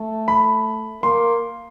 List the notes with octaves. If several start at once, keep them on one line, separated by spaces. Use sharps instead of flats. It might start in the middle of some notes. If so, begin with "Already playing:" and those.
Already playing: A3
B5
A#3 C6